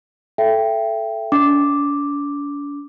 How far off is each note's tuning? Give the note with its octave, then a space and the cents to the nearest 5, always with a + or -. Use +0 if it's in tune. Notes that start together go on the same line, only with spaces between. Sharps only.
A4 -10 E5 +25 G5 +0
D4 -45 D6 +0